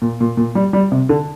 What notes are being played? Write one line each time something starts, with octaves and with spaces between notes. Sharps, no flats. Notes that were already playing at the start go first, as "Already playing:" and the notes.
A#2
A#2
A#2
G3
G3
C3
D3